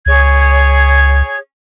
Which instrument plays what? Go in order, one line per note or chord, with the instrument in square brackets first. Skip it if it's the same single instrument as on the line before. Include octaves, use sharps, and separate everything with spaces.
[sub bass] C#2 [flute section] G#4 C#5 G#6